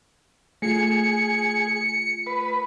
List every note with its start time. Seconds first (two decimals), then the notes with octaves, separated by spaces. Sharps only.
0.62 A3 F4 G#4 C#7
2.27 B4